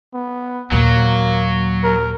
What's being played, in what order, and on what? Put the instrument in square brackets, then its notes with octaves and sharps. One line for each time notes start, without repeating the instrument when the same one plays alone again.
[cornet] B3
[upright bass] D#2 A#2 [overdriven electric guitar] F#3 [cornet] A#3
[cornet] A#4